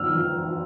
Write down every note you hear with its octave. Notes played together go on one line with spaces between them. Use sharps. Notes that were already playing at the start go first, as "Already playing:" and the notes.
Already playing: E6 F6
E3